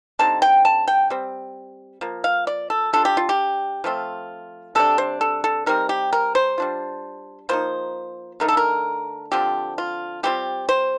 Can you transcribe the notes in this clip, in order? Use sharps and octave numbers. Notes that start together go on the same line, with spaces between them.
D3 G3 C4 D#4 A5
G5
A5
G5
G3 C4
F3 A#3
F5
D5
A4
G3 D4 F4 A4
G4
F4
G4
F3 A3 C4 F4
C3 G3 D4 A4
C5
A4
A4
G3 C4 D#4 A#4
G4
A#4
C5
G3 D4 F4
F3 A#3 D#4 C5
D3 A3 D#4 A#4
A4
A#4
D3 F3 C4 G4
F4
G3 C4 F4 G4
C5